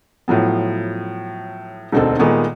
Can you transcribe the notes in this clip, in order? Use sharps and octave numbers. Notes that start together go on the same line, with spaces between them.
A2 F3 F#3 B3
E1 D2 C4 D#4 A4
A#2 D#3 G#3 A3 B3